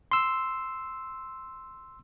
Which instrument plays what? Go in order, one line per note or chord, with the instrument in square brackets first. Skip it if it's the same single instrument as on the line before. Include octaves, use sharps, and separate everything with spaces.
[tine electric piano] C6 E6